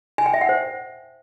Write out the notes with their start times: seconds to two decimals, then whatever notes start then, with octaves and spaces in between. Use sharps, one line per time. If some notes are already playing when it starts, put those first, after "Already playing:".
0.18 G#5
0.26 G5
0.34 E5
0.41 F#5
0.49 C5